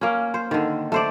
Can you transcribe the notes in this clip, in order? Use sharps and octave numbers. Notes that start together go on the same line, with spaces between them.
A#3 C#4
C5
D3 D#3
A3 C5 D5